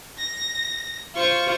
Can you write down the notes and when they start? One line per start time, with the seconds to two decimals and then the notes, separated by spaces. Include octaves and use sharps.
0.18 A#6
1.16 F4 C5 C#6